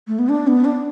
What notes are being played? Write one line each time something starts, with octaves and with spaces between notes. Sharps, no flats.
A3
B3
D4
B3
D4